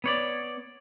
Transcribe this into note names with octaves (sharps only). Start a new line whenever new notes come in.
B3 C#5 D5